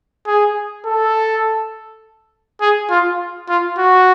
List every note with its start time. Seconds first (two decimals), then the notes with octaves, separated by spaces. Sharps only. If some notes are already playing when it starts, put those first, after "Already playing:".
0.27 G#4
0.86 A4
2.61 G#4
2.90 F4
3.49 F4
3.78 F#4